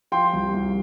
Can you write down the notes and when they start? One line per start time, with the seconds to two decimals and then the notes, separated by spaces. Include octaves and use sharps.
0.12 F3 G5 C6
0.33 C2
0.54 C2